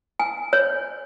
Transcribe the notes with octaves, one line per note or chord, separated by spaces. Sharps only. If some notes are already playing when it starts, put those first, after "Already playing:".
G#5
C#5